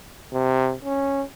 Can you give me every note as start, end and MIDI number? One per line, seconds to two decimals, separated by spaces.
0.33 0.74 48
0.85 1.23 61